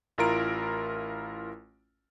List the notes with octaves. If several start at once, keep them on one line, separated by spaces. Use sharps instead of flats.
A1 E4 F4 A#4 A#5 D7